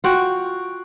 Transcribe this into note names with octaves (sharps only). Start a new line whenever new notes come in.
F4 F#4 G5